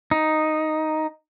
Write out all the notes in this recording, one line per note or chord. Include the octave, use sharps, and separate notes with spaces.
D#4